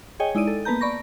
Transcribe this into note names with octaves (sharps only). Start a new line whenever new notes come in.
G#4 C#5 D#5 G5 G#5
G#3 D#4 E4 D5 D#7
A4
A#3 B3 B4 A5 A#5 G6
D5 B5 C#6 A#6